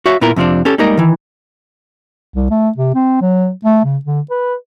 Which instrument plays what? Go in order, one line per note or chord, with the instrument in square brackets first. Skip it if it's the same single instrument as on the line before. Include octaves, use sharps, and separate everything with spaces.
[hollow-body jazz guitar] F#4 C#5 E5 F5
A#2 B3 E4 F4 A#4
F2 C3 F3 C4 D4
C#4 G4 A4
G3 G#3 A#3 D#4 A#4 D#5
D#3 E3
[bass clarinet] C2
A3
C3
C4
F#3
A3
C#3
D3
B4